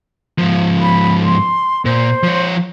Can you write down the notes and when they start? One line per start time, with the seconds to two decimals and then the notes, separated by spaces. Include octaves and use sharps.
0.38 G#2 F3
0.81 B5
1.25 C6
1.85 A#2 C5
2.24 F3 C#5